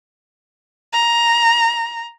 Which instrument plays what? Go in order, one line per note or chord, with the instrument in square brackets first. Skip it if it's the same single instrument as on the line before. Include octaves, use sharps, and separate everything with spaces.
[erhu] A#5